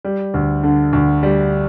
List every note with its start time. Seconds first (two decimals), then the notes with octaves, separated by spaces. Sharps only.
0.05 G3
0.34 D2
0.63 D3
0.93 D2
1.23 G3